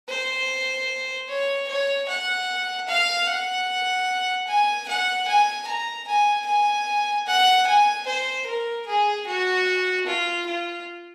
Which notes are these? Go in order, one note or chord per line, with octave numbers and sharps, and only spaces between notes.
C5
C#5
C#5
F#5
F5
F#5
G#5
F#5
G#5
A#5
G#5
G#5
F#5
G#5
C5
A#4
G#4
F#4
F4
F4